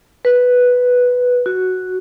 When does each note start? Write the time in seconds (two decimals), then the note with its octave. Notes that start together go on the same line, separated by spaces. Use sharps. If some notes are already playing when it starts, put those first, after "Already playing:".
0.25 B4
1.46 F#4